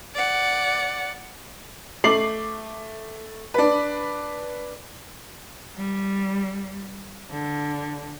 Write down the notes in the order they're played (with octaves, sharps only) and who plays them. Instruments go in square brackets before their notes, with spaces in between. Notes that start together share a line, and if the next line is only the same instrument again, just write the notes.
[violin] D5 F#5
[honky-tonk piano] A3 D6 C7 F#7
D4 B4
[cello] G3
D3